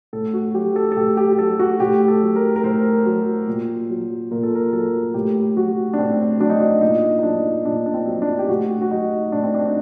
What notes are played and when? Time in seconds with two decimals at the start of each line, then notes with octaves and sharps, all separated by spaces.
0.13 A2 A4
0.34 F#4
0.54 F#3 G4
0.76 A4
0.92 A4
0.96 A2 G4
1.17 G4
1.33 G4
1.38 F#3 A4
1.59 F#4
1.80 A2 G4
2.08 A4
2.22 F#3
2.36 A#4
2.56 A#4
2.64 A2 C5
3.05 F#3
3.48 A#2
3.90 F#3
4.31 A#2 A#4
4.43 A4
4.55 A#4
4.73 F#3 A4
5.14 A2 G4
5.56 F#3 F#4
5.94 D4
5.98 A2 C4
6.40 F#3 D4
6.50 D#4
6.60 D4
6.82 A#2 D#4
7.19 D#4
7.23 F#3 D4
7.65 A#2 D4
7.86 D4
7.94 C4
8.07 F#3
8.22 D4
8.39 G4
8.49 A2 F#4
8.82 F#4
8.91 F#3 D#4
9.32 A2 D4
9.43 C4
9.55 D4
9.65 D#4